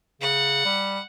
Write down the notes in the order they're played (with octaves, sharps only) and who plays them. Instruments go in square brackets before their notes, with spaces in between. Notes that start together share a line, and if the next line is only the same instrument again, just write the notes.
[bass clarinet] C#3 [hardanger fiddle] F#5
[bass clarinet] G3